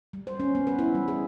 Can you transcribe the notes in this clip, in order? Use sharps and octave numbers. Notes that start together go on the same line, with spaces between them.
G3
C5
C#4
B3
B4
E4
G3
G#4